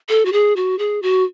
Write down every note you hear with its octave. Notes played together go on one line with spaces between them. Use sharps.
A4
F#4
G#4
F#4
G#4
F#4